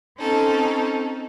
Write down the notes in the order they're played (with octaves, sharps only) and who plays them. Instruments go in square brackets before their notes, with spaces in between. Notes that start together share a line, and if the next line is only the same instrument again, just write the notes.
[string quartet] C4 C#4 D#4 A4